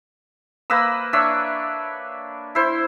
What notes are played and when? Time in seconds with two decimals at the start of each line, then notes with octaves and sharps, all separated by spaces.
0.70 A#3 B4 D#6 E6
1.13 D4 C#5 E5
2.55 E4 C5